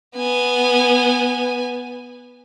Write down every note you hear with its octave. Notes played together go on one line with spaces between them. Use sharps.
B3 G#5